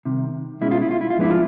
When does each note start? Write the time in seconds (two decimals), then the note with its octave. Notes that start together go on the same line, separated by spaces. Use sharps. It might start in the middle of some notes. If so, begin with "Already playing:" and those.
0.05 C2 C3 D#3
0.61 B2 G#3 C#4 E4
0.71 F4
0.81 E4
0.91 F4
1.01 E4
1.10 F4
1.17 G#2 F3 G#3 B3 D4 E4
1.30 F4